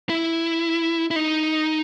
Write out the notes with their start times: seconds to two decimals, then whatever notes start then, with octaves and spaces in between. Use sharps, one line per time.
0.09 E4
1.11 E4
1.16 D#4